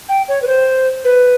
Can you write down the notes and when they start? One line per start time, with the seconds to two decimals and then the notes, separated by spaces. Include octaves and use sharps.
0.09 G5
0.28 C#5
0.42 B4
0.47 C5
1.04 B4